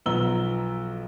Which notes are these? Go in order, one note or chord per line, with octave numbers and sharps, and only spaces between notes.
B1 F3 B3 A#5 E6 G7